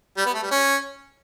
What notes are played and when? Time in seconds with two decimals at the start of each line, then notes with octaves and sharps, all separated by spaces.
0.18 G3
0.26 B3
0.35 A3
0.43 G3
0.51 C#4